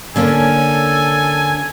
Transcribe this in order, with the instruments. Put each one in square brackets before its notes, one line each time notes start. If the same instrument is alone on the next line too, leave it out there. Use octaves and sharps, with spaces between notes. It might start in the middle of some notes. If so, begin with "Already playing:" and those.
[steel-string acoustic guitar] D3 A#3 C#4 [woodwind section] A4 [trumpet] G#5